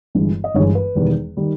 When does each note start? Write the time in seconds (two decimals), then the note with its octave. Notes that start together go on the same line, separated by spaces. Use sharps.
0.15 G1 G2 E3 G#3
0.44 D#5
0.54 G1 G2 E3 G#3 C#5
0.75 B4
0.95 E1 E2 D#3 G3
1.37 D#3 G3